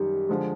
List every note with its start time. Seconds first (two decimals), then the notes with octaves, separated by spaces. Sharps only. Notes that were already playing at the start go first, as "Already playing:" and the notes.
Already playing: F#2 D#3 G3
0.29 D3 F3 G#3